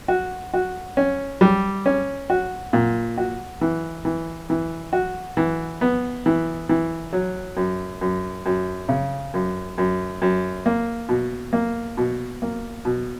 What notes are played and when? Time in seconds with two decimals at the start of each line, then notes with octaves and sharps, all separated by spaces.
0.08 F#4
0.54 F#4
0.97 C#4
1.41 G3
1.86 C#4
2.30 F#4
2.73 A#2
3.18 F#4
3.61 E3
4.05 E3
4.50 E3
4.93 F#4
5.37 E3
5.81 B3
6.26 E3
6.69 E3
7.13 F#3
7.57 F#2
8.01 F#2
8.46 F#2
8.89 C#3
9.34 F#2
9.78 F#2
10.22 F#2
10.66 A#3
11.09 B2
11.53 A#3
11.97 B2
12.42 A#3
12.85 B2